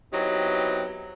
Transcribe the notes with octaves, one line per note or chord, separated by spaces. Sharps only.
F#3 B3 C4 D#4 E4 G4